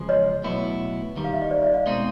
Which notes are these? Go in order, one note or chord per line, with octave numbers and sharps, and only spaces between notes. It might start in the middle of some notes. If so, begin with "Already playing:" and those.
Already playing: E2 C#3 F3 G#3
C#5 D#5
B1 A2 F#3 B3 E4
D#2 D#3 G3
F5
E5
D#5
C5 D5
D5 E5
D#5 F5
B2 G#3 C4 D#4